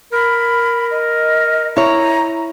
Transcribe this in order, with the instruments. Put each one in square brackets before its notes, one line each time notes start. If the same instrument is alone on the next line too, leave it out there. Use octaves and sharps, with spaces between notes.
[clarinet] A#4 [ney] B5
[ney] D#5
[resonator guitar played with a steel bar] E4 C#5 [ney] A#5